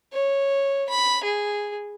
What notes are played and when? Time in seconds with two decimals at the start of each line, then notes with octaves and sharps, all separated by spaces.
0.12 C#5
0.89 B5
1.23 G#4